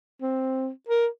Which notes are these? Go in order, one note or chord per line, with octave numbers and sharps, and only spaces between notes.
C4
A#4